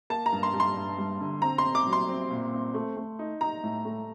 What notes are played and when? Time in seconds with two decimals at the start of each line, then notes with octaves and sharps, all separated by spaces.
0.10 A#3 A5
0.26 A#5
0.32 G2
0.43 C6
0.54 G3
0.60 C6
0.76 G2
0.98 G3
1.20 D3
1.42 C4 A#5
1.58 C6
1.65 C4
1.75 D6
1.86 F#3
1.93 C6
2.08 C4
2.31 A#2
2.53 C4
2.74 A3
2.96 A3
3.19 D#4
3.41 D#4 A#5
3.64 A2
3.85 A3